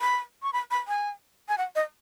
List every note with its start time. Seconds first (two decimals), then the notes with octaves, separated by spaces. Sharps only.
0.01 B5
0.43 C#6
0.53 B5
0.71 B5
0.88 G#5
1.49 G#5
1.58 F#5
1.75 D#5